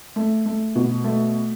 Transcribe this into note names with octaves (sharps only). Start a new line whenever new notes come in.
A3
A3
B2
A3